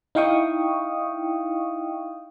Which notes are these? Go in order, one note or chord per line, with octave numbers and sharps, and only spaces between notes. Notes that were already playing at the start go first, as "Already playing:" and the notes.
D#4 E4 F5 G5 C#6 D#6